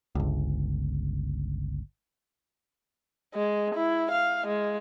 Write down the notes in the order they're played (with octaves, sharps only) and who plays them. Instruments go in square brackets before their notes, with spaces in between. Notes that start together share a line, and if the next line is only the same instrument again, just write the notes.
[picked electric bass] G1 C#2
[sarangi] G#3
E4
F5
G#3